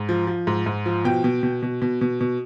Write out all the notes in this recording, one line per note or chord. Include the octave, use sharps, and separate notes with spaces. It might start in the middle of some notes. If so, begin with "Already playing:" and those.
Already playing: G#2
F3
F3
G#2
G#2
F3
B2 G5
B2
B2
B2
B2
B2
B2